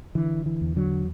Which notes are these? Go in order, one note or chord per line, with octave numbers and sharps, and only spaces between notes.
D3 E3
E3
E2
D3 F#3